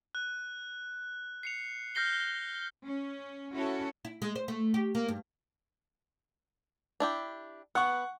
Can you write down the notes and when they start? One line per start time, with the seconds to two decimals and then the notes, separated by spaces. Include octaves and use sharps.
0.15 F#6
1.43 C7 C#7 F7
1.95 F6 G6 A#6 C7 G7
2.85 C#4
3.54 C#4 E4 F#4 A4 C#5
4.05 E4
4.22 G#3
4.36 C5
4.48 A3
4.74 G4
4.95 A#3
5.08 G2
7.00 D4 E4 G4
7.75 B3 F#5 C#6